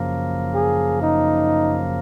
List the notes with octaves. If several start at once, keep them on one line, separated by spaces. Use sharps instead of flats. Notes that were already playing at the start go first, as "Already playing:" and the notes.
Already playing: F#2 C#3 F3 A#3
G#4
D#4